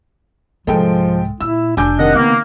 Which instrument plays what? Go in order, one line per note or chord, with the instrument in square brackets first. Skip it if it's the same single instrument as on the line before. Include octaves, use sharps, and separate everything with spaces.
[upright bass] C2 G#2 [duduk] F3 [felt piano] G#3 A4 G5
[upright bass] A#2 [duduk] E4 [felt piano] E6
[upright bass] F1 [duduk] D4 [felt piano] G#5 D6 G6
[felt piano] C3 D#3 [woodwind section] D#5 F#5
[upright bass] C#3 [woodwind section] A#3 [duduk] B3